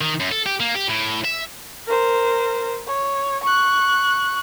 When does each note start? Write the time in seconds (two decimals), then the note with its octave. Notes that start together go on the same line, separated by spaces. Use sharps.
0.01 D#3
0.20 F#2
0.32 A4
0.46 G4
0.60 A#3
0.75 G4
0.88 A2
1.25 E5
1.87 A#4 C5
2.87 C#5
3.43 C#6 F#6